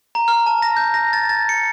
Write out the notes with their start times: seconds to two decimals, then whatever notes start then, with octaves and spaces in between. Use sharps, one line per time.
0.15 A#5
0.28 F6
0.46 A5
0.62 A#6
0.77 G6
0.94 A#6
1.13 A6
1.29 A6
1.49 C#7